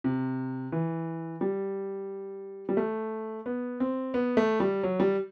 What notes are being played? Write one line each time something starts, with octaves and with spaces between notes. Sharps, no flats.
C3
E3
G3
G3
A3
B3
C4
B3
A3
G3
F#3
G3